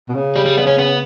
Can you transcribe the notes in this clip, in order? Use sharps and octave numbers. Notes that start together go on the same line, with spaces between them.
B2
C#3
G3
G3
B3
C#4
B3